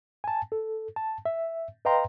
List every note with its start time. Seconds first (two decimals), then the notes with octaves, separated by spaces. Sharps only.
0.24 G#5 A5
0.52 A4
0.96 A5
1.26 E5
1.85 B4 D#5 F5 G5 A#5 C6